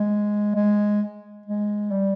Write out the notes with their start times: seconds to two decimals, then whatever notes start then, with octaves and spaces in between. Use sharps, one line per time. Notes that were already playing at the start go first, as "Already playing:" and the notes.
Already playing: G#3
0.56 G#3
1.46 G#3
1.91 G3